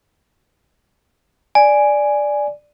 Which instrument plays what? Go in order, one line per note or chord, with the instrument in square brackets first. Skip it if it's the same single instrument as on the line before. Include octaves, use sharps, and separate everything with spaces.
[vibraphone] D5 [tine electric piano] G#5